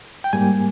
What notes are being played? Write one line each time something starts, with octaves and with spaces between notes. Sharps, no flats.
G5
G#2 G3 A#3 G#5